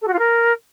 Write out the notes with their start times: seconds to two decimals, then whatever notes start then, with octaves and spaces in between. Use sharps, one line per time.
0.02 A4
0.08 F#4
0.13 F4
0.19 A#4